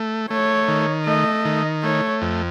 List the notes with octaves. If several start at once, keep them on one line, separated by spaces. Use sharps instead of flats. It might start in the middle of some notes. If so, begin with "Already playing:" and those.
Already playing: A3
A3 C#5
D#3
A3 D#5
D#3
A3 C#5
F2